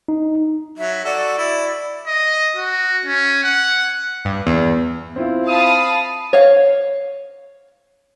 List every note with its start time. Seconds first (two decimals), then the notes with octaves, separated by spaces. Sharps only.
0.08 D#4
0.78 F#3 E5
1.05 F#4 A4 D5
1.38 E4
2.07 D#5
2.56 F#4
3.05 C#4
3.44 F#5
4.25 G2
4.47 E2
5.16 C4 E4 F4
5.48 F5 A5 B5 D#6
6.33 C#5 F5